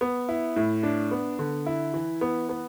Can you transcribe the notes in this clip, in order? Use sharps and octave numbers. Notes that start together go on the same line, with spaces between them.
B3
E4
A2
D4
B3
D3
E4
E3
B3
B3